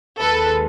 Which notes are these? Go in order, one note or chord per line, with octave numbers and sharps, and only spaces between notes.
D#2 D#3 G#3 A4 B4